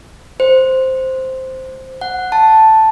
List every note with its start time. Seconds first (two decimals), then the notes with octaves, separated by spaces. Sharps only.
0.40 C5
2.01 F#5
2.32 A5